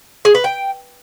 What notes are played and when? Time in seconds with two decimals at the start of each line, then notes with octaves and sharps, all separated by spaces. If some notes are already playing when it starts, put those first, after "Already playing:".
0.25 G#4
0.35 B4
0.44 G5